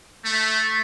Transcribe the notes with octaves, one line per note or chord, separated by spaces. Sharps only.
A3